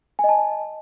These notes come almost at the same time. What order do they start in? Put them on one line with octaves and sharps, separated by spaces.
G#5 D#5 A5